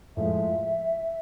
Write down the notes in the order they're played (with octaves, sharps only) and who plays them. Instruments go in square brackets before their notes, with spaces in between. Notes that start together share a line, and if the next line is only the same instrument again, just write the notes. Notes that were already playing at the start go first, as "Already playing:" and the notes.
[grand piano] A2 F3 G#3 [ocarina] E5